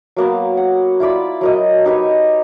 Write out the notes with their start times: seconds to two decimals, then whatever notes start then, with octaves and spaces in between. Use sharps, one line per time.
0.16 F#3 A#3 B3
0.57 F#5
1.00 E4 F4 D5 B5
1.41 F#3 A#4 D#5
1.85 D#4 G4 B4 C#5